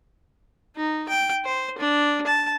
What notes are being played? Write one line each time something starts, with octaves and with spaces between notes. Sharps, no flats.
D#4
G5
C5
D4
A5